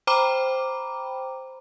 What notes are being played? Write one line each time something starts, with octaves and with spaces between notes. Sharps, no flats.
C5 G5 A#5 B5 D6